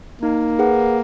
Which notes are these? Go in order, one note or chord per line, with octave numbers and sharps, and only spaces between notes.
A#3 D#4
G#4 B4 F#5